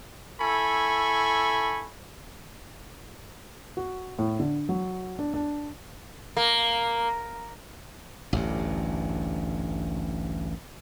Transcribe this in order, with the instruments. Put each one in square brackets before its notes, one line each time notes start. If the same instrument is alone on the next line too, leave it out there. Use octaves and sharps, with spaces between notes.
[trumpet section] E4 A4 G#5 B5 C#6
[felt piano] F#4
A2
D3
F#3
D4
D4
[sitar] A#3
[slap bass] A1 D2 G2